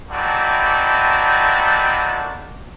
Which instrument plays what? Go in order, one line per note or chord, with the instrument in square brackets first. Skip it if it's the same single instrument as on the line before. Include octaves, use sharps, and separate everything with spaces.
[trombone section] D#3 E3 A3 C4 D4 F#4